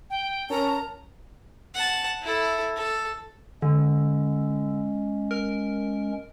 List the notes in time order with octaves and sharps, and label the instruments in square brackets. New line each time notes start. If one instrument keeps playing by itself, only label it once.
[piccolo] G5
[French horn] C#4 [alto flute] A#4 [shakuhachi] A5 [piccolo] A#5
[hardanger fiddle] F#5 A5
E4 A4
A4
[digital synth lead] D3 [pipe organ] G#3 C#4
[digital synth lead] A#4